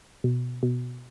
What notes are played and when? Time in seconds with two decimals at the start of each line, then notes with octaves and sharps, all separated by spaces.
0.24 B2
0.63 B2